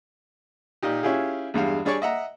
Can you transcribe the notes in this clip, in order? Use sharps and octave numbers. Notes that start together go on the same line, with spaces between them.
A#2 D#4 G4
C#4 E4 F4 G4 G#4
E2 G2 G#3 F5
G3 D4 G#4 C#5 D5 C#6
D#5 E5 F#5 A#5